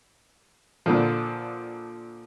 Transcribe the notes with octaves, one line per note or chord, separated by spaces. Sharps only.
A#2 D3 F3